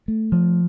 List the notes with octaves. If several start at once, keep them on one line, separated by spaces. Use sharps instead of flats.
A3
F3